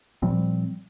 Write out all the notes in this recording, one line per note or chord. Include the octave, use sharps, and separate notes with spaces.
A#2 F3 G3 C4